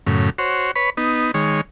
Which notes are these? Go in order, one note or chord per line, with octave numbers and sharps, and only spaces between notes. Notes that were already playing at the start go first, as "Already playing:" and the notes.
F#2 A2 C#3
F#4 C5 C#5
B4 C#5 B5
B3 D#4
D#3 G#3 C#5